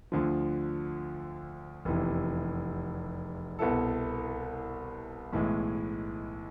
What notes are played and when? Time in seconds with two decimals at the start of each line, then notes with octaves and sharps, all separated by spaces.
0.12 D2 D3 F3
1.85 F1 E2 C3 E3
3.59 C2 B2 B3 E4 A4
5.33 B1 A2 E3 G#3